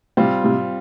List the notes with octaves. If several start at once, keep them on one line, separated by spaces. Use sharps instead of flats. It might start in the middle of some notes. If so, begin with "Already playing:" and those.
A2 C3 G3 C4 F4
A2 C3